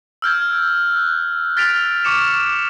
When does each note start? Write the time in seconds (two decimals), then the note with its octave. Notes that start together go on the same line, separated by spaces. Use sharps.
0.22 E6 F6 G6 G#6
0.96 F#6
1.57 F6 A6 B6 D7 F7
2.04 C#6 D6 C#7 E7